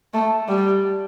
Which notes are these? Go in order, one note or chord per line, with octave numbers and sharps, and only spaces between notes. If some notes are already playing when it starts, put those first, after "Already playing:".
A3
G3